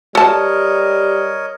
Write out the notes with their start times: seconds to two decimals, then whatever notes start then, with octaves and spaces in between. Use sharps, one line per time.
0.15 G3 A4 A#4 C#5 D#5 A5